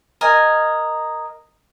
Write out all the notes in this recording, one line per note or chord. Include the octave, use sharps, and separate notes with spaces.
A#4 D#5 G#5